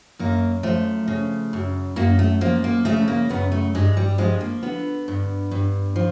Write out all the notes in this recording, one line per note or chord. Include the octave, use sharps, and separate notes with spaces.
F#2 A#3
F3 A3
C#3
F#2
F#2 A#3
A3
F3 A#3
A#3
C#3 A3
A#3
F#2 B3
A3
G2 G#3
G3
F3 G#3
A#3
D3 B3
G2
G2
F3